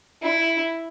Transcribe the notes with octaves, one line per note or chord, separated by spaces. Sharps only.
E4